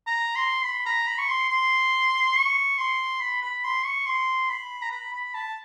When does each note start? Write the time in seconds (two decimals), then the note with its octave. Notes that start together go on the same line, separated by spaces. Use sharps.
0.07 A#5
0.36 C6
0.64 B5
0.86 A#5
1.07 B5
1.19 C#6
1.28 C6
1.49 C6
2.36 C#6
2.78 C6
3.21 B5
3.42 B5
3.64 C6
3.85 C#6
4.06 C6
4.50 B5
4.82 A#5
4.91 B5
5.13 B5
5.34 A5